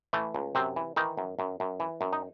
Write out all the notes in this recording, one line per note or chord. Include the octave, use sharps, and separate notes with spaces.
E3 A3
C#2
F#2 C3 C4
E3
D#3 E3 D#4
F#2
F#2
F#2
E3
F#2
D#4